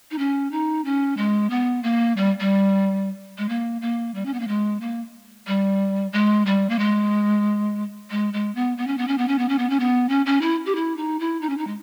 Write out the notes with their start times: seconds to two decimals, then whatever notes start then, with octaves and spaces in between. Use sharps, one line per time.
0.11 D#4
0.18 C#4
0.51 D#4
0.85 C#4
1.17 G#3
1.50 B3
1.83 A#3
2.17 G3
2.40 G3
3.38 G#3
3.49 A#3
3.81 A#3
4.15 G3
4.25 C#4
4.34 B3
4.40 A#3
4.48 G#3
4.81 A#3
5.47 G3
6.13 G#3
6.46 G3
6.69 A#3
6.79 G#3
8.11 G#3
8.33 G#3
8.55 B3
8.77 B3
8.87 C#4
8.98 B3
9.08 C#4
9.18 B3
9.28 C#4
9.38 B3
9.49 C#4
9.59 B3
9.70 C#4
9.80 B3
10.09 C#4
10.26 C#4
10.41 E4
10.66 G4
10.75 E4
10.97 D#4
11.20 E4
11.41 D#4
11.49 C#4
11.58 D#4
11.67 G#3